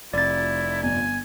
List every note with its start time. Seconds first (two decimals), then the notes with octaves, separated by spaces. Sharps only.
0.13 F1 E4 D5 A6
0.83 G1 G#5